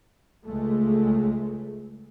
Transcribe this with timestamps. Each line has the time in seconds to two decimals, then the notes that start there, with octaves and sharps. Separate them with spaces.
0.47 C#2 G#3 A3